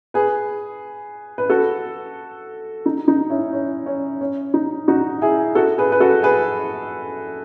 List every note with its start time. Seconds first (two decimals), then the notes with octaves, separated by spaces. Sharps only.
0.14 G#4 B4
1.38 B4
1.50 F#4 A4
2.86 D#4
3.08 D#4
3.30 C#4 E4
3.53 C#4
3.86 C#4
4.21 C#4
4.54 D#4
4.88 D#4 F#4
5.22 E4 G#4
5.55 F#4 A4
5.78 G#4 B4
5.92 B4
6.00 F#4 A4
6.23 G#4 B4